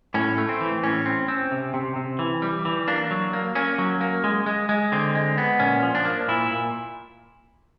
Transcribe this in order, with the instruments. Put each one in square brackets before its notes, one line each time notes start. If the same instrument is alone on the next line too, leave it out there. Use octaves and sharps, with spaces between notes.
[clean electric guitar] A2 C#4
A3
C4
E3
A2 C#4
C4
C4
C3
C3
C3
E3
G3
E3
A#3 D4
F#3
A#3
A#3 C#4
F#3
A#3
G#3
G#3
G#3
D3 C4
G#3
B3
A#2 C#4
F3
D4
A#3
A#2 E4
A#2